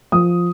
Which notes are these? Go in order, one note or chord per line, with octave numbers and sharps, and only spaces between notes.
F3 D#6